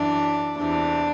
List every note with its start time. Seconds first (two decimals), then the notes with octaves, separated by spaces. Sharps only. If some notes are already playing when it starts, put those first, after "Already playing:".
Already playing: F#2 E3 D4
0.56 E2 C3 E3 D4